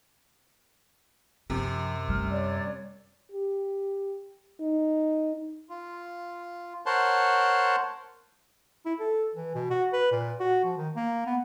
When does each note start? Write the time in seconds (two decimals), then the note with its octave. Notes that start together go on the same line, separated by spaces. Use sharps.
1.50 F#2 C3 F3
2.08 G3 A3 F6
2.31 C#5 D5
3.32 G4
4.61 D#4
5.69 F4
6.86 A#4 C5 C#5 F#5 A5 C6
8.86 E4
9.00 A4
9.35 E3
9.55 B2
9.70 F#4
9.93 B4
10.12 A#2
10.40 F#4
10.65 F3
10.77 D#3
10.96 A#3
11.27 B3